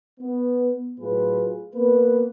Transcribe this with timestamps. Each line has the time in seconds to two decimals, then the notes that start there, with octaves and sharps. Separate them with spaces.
0.20 B3
0.99 A2 F#3 F4 G#4 B4
1.74 A#3 B3 B4